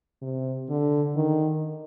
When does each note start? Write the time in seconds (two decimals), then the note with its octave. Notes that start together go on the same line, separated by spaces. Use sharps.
0.22 C3
0.69 D3
1.16 D#3